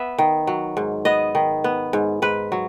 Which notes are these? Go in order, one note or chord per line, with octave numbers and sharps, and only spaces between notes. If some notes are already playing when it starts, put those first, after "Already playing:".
Already playing: B3 E5
D#3
F#3
G#2
B3 D#5
D#3
B3
G#2
G#2 B4
F#3